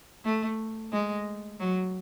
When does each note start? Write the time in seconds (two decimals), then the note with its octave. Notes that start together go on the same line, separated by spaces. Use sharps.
0.25 A3
0.93 G#3
1.60 F#3